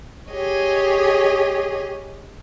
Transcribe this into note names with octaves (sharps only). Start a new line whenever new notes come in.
G4 G#4 C#5 D#5